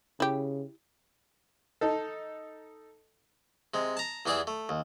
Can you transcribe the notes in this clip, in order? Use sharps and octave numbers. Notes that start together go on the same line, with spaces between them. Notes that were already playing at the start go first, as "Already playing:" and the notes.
C#3 E4 G4
D#4 A4
C3 G#3
A5 A#5
E2 E3 G4 G#4 D5 E5
A3
D#2